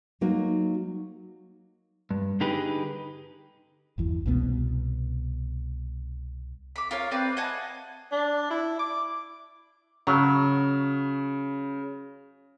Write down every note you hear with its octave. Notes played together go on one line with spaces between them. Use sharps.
F#3 A#3 D#4 F#4
G2
D3 D#4 G4 G#4 B4
G1 E2 E3
C2 B2 G3 B3
B5 D6
F4 A#4 C#5 F5
C4 B4 D5
D#5 F#5 G#5 A5
D4
E4
D6
C#3 F#3